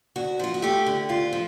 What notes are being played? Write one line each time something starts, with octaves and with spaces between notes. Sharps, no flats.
D2 F#4
F3 F4
F#4
A3 G4
D3
D2 F4
F3